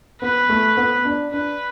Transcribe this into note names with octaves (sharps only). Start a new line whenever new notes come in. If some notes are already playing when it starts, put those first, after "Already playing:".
B3 B4
A3
B3
D4
D4 B4